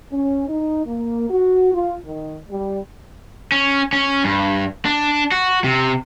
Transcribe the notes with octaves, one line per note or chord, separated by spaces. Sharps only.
C#4
D#4
A#3
F#4
F4
D#3
G3
C#4
C#4
G2
D4
F#4
C3